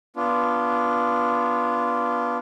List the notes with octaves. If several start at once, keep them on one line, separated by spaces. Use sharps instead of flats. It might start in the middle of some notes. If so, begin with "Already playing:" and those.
B3 D4 F4